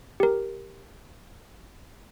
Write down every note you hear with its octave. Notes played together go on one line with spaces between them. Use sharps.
G4 A#4